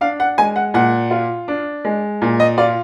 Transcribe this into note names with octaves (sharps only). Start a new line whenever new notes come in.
D4 F5
F#5
G#3 G#5
F#5
A#2 F#5
F4
D4
G#3
A#2
D#5
F4 D5